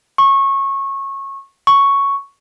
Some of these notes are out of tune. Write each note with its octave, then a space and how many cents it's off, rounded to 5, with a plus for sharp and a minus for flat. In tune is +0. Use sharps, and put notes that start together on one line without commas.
C#6 -20
C#6 +0